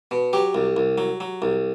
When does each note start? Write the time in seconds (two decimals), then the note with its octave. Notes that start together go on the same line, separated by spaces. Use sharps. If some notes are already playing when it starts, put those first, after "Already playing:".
0.11 B2
0.33 F#3 G4
0.55 C2
0.77 C2
0.98 F#3
1.20 F#3
1.42 C2